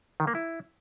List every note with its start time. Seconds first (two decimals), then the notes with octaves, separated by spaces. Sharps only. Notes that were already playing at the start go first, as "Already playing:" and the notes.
0.20 D#3
0.27 A#3
0.35 E4